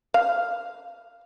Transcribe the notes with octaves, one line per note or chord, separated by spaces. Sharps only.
F5